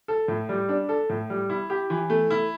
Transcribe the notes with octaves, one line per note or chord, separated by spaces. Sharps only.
A4
A2
G3
D4
A4
A2
G3
E4
G4
E3
A3
E4